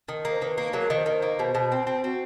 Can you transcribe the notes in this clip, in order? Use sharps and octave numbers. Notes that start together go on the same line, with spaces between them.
D#3
A#3
C5
D#3 B4
A#3
F#3 A#4
D#3 C5
D#3
C5
A#3
B4
B2 C5
B2
C4
C4
C4 F#4